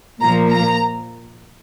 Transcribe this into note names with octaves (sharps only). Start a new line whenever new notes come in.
A#2 F3 A#3 A#5
A#5